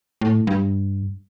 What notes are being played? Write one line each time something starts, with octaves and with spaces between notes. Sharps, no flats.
A2
G2